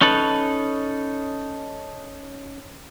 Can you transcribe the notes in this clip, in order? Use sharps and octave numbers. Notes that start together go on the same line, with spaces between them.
C#4 D#4 A4 B4